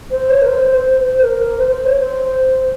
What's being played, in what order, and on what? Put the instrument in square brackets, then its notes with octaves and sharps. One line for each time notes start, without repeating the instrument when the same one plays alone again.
[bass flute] C5
C#5
A#4
C5
C5
C5
A#4
A#4
C5
C5
C#5
C5